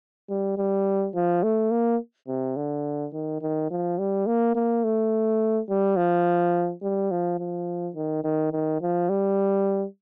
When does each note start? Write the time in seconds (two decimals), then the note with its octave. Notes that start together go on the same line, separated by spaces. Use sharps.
0.30 G3
0.58 G3
1.15 F3
1.43 A3
1.71 A#3
2.28 C3
2.56 D3
3.13 D#3
3.42 D#3
3.71 F3
3.99 G3
4.27 A#3
4.56 A#3
4.84 A3
5.69 G3
5.97 F3
6.82 G3
7.11 F3
7.39 F3
7.96 D#3
8.24 D#3
8.52 D#3
8.81 F3
9.09 G3